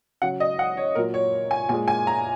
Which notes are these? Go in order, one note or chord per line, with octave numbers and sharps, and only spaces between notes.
C#3 F#3 F#5
D#5
F#5
C#5
A#2 F#3 A#4
C#5
G#5
A#2 G#3 G#5
G#5
A#5